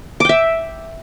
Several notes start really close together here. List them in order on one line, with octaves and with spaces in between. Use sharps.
D6 G5 E5